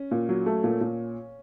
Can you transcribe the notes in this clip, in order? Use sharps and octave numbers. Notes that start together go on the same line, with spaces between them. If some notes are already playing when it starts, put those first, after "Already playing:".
Already playing: C#4
A#2
F#3
A3
A#2
A#2